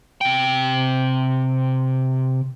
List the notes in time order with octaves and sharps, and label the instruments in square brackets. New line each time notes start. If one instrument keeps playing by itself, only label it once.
[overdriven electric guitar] C3 G5